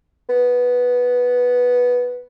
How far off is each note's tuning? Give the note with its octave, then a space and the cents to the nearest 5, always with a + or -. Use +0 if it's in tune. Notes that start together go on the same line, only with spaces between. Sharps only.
B3 -5